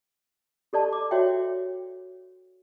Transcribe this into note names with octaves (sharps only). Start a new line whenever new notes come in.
G4 A4 D5 A5
D6
F#4 C#5 D5 E5 G5